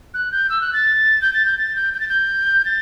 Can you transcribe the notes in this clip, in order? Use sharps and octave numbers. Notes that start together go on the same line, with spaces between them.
F#6
G6
E6
F#6
A6
G6
A6
G6
A6
G6
G6
A6
G6
A6